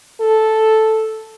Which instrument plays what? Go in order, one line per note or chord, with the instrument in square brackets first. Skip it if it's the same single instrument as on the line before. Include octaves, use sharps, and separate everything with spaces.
[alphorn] A4